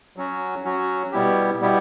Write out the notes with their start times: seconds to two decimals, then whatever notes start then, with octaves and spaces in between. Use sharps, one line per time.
0.16 F#3 C#4 F#4
0.64 F#3 C#4 F#4
1.12 B2 G3 B3 E4 G4
1.61 B2 G3 B3 E4 G4